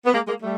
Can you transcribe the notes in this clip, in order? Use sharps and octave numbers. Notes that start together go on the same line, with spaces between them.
B3
G#3 A#3
G#3 A#3
G3 A3